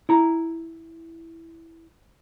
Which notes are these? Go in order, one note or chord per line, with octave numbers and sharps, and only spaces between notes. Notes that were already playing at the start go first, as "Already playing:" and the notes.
E4 A#5